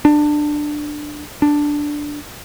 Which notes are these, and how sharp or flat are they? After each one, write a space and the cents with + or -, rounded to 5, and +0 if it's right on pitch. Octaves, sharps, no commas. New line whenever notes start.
D4 +15
D4 +0